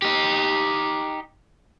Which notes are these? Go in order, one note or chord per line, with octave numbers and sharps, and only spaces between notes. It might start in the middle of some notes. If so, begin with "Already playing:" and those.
D#4 G4